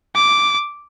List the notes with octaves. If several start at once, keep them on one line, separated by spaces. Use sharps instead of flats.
D6